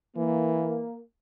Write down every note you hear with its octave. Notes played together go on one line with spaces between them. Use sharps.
E3 A#3